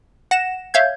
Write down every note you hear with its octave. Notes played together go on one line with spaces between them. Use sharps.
F#5 A#6 E7
C#5 E5 F5 G6 G#6